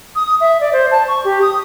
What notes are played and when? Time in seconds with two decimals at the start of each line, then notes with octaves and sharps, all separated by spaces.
0.16 D#6
0.41 E5
0.61 D5
0.73 C5
0.91 A5
1.08 C#6
1.25 G4
1.42 D#6